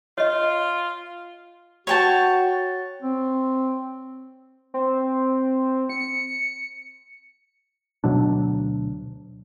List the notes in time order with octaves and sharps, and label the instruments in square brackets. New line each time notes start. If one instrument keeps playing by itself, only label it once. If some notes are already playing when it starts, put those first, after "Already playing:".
[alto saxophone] F4 [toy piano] C#5 D#5
[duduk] F#4 [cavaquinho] C#5 G5 A5
[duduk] C4
[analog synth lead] C4
C#7
[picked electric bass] D2 B2 F#3 D4